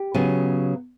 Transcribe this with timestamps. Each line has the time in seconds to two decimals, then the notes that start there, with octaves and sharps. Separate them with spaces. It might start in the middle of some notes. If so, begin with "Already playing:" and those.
Already playing: G4
0.14 C#3 F#3 B3